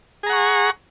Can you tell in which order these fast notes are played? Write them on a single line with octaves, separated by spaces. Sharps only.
G#4 A#5 F#5 C#6